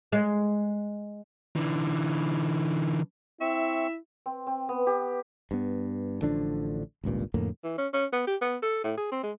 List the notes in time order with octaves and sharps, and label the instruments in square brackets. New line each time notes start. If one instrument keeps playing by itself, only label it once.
[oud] G#3
[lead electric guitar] D3 E3
[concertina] C4 C#6 [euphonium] E4 [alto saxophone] E5
[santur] C4
C4
B3
G4
[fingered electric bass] G2 B3
A1 D3 F3 D4
G#1 C#2 G2 A#2
F2 A2 D3 A#3
[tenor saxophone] E3
C#4
C#4
B3
G4
B3
A4
A2
G#4
C4
G#3